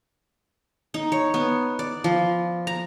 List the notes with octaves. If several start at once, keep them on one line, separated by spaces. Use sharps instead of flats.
D#4
C#5
B3
D5
F3
A#5